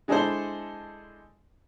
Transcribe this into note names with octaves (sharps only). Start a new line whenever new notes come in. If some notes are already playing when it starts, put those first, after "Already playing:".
D3 G#3 D4 E4 A4 C5